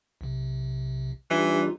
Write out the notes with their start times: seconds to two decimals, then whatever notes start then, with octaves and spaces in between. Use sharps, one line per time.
0.21 B1 C3
1.31 E3 G3 D4 D#4 F4